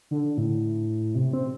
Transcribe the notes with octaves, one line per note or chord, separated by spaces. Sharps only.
D3
A2
C3
C4